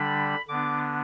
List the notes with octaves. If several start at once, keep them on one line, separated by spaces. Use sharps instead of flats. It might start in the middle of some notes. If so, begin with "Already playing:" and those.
Already playing: D3 G3 D4 B5
D3 B3 D4 D6